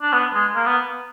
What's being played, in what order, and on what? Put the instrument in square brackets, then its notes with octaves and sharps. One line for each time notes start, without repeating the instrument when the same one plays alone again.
[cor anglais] D4
B3
G#3
A#3
B3